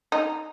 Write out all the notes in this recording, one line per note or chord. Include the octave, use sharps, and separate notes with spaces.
D#4